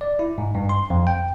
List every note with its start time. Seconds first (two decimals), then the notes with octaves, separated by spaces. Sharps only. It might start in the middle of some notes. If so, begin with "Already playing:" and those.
0.01 D5
0.19 E4
0.38 G#2
0.55 G2
0.69 C6
0.90 F2
1.07 G5